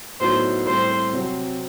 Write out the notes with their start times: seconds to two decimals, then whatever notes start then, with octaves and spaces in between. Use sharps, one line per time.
0.20 A2 F#3 B3 D#4 F#4 C5
0.66 A2 G3 C4 C5
1.13 C3 F#3 C4 F#4